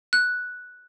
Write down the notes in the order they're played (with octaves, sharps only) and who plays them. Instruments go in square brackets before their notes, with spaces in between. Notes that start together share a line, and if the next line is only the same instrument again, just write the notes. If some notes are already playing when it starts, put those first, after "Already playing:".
[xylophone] F#6